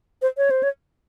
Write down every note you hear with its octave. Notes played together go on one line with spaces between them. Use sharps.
C5
C#5
C5
C#5